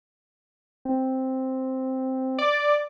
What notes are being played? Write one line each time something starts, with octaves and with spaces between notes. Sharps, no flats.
C4
D5